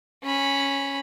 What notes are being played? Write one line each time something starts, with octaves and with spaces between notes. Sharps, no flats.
C#4 B5